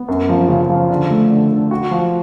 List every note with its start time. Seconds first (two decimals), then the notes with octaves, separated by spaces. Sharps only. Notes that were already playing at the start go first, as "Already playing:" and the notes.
Already playing: B3
0.08 F#2
0.29 F3
0.48 C#3
0.69 F3
0.90 D3
1.10 A3
1.30 D3
1.51 D3
1.71 F#4
1.91 F3